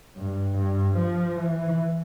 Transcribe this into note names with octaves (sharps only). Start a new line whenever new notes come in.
G2
G2
F3
E3